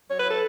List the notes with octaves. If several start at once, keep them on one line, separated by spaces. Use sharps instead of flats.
F#3 C#5
B4
E4 A4